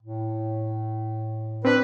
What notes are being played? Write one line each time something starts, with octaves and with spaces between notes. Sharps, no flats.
A2
C4 D4 B4